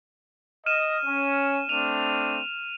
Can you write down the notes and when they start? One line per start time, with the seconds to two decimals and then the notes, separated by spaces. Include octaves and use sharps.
0.66 D#5 F6 D#7 E7
1.05 C#4
1.69 A3 C4 D4 D#7 F7